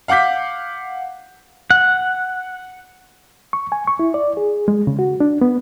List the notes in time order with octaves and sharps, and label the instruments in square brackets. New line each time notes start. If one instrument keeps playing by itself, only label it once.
[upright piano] F5 F#5 D6 G6 B6
[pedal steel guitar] F#5
[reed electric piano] C#6
G#5
C#6
E4
D5
G#4
G#3
C#3
F#4
D4
B3